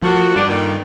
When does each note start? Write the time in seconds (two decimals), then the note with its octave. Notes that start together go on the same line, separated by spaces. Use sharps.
0.03 F3 A3 A#3 F#4
0.36 G2 G3 B3 D4
0.49 A#2 D3 D#3